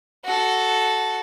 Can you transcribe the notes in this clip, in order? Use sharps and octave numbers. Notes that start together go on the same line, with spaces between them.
F#4 A4